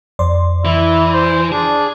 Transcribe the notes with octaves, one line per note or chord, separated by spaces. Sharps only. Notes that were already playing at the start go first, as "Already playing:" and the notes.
F2 D5 C6
E3 E4
C5
D4 G#4